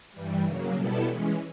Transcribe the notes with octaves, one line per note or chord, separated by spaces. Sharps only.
G2 E3 G3
C#3 F#3 A#3
B2 G3 B3 E4 A4
E3 G#3 C#4